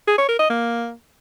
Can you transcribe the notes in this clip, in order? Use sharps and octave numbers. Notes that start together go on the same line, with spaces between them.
G#4
C#5
A#4
D#5
A#3